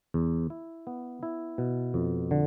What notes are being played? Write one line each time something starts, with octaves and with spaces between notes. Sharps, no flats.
E2
E4
B3
E4
B2
F2
D3